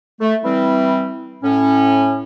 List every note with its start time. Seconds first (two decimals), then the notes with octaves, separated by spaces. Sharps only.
0.21 A3
0.44 E3 G3 C4 E4
1.43 A2 C#4